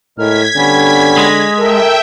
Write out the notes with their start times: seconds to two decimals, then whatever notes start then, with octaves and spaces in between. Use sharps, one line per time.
0.18 A2 G#3 A#4 F6 G#6 B6
0.56 D3 G3 B3 C#4
1.17 G#3
1.59 A4 A#4 E5 G5